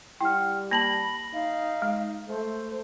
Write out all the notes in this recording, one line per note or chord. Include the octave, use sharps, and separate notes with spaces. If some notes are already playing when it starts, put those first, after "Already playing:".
G3 E4 F#5 G5 F6
A#3 A5 B5 A#6 F#7
D#4 F5
G#3
A3 C5